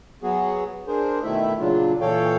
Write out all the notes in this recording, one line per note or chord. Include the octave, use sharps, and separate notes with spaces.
F#3 B3 F#4 G#4
D4 G#4 A#4 C5
B2 D#3 A3 E4 E5
A#2 C#3 F#3 D4 F4
A#2 E3 A4 C#5 F5 G5